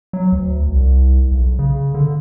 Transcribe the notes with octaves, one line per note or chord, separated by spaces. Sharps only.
F#3
D2
C2
B1
C#3
D3